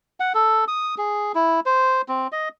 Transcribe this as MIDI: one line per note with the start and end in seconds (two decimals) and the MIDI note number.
0.20 0.33 78
0.34 0.65 69
0.68 0.95 87
0.98 1.32 68
1.35 1.60 64
1.66 2.02 72
2.09 2.27 60
2.32 2.49 75